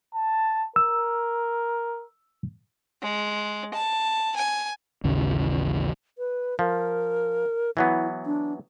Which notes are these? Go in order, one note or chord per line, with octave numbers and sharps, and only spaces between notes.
A5
A#4 E6
G#3
A5
G#5
A1 D#2 C#3 E3
B4
F3 A#4
E3 F#3 B3 E4
D4